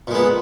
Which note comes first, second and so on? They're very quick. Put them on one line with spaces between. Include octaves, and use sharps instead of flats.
A#2 G#3 B3